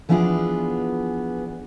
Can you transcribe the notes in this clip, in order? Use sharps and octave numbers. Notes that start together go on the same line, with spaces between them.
E3 F3 B3 D4 F4 G#4